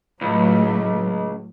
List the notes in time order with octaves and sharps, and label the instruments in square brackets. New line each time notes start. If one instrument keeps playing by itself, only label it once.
[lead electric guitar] C#2 [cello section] A2 F#3 A3